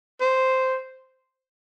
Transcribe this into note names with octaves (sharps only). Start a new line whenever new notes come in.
C5